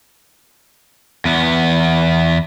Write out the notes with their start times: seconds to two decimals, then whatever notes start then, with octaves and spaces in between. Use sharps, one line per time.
1.25 E2 B3